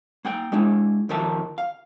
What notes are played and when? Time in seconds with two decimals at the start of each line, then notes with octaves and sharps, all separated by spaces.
0.25 A#3 F#5 G5
0.52 G#3 D4 E4
1.09 D#2 D#3 F3 A#4 E5 A5
1.58 F5